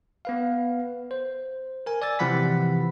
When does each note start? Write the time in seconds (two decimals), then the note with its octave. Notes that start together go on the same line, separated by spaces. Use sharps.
0.25 B3 B4 F5
1.11 C5
1.86 A#4 G#5
2.02 D5 G#5 E6 A6
2.19 C3 E3 F3 F#5 B5 B6